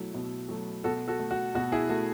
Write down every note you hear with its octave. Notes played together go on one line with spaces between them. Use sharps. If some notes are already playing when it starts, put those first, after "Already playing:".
Already playing: B2 F#3 A3 E4
B2
F#3 A3
B2 F#4 A4
F#4 A4
A3
F#4
B2 F#4
E4 G#4
A3 F#4